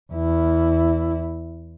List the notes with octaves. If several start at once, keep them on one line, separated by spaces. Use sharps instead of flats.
E2 E4